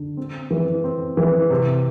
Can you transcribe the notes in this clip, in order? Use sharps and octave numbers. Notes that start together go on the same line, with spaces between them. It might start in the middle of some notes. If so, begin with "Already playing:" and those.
Already playing: D3
C4
E3
C4
E3
C3